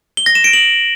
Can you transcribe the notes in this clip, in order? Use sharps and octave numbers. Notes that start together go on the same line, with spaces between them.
G7
A#6
E7
D7
F#7